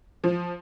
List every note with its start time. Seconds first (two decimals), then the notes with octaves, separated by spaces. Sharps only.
0.24 F3